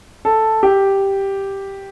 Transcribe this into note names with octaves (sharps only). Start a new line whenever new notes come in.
A4
G4